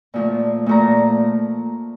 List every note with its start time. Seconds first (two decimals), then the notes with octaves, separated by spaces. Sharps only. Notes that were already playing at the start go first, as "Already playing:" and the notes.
0.14 A#2 F3 A3
0.66 A#2 F3 A3 A#5